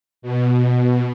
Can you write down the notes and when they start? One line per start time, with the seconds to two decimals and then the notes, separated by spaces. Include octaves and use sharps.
0.22 B2